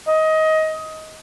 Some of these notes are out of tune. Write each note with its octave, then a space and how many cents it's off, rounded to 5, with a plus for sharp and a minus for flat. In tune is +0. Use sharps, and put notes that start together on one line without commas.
D#5 +20